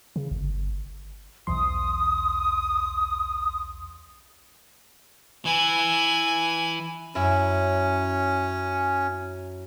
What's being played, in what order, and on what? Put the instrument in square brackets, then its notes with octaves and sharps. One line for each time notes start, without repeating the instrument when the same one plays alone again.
[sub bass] C#3
G1
[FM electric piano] B1 E2 C6 [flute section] D#6
[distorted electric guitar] E3 E4 [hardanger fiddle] G#5
[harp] F#2 [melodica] C#4 [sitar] E4